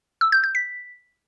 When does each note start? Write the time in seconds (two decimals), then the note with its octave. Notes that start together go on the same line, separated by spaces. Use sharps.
0.21 E6
0.32 G6
0.44 G6
0.55 B6